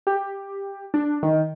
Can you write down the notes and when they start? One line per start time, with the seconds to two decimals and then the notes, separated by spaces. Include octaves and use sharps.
0.07 G4
0.94 D4
1.23 D#3